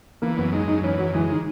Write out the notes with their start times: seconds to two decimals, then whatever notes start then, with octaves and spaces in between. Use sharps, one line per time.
0.22 E3 A#3
0.37 F#2 B3
0.53 G#3 D#4
0.68 F#2 D#4
0.83 E3 C#4
0.98 F#2 F#3
1.14 E3 G#3
1.30 D#3